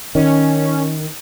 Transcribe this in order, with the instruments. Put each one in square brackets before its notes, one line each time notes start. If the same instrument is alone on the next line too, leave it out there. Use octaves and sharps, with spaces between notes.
[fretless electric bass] D#3 [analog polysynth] C#4